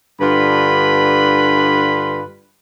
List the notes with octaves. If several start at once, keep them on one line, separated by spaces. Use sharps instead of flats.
G2 D3 F4 B4 B5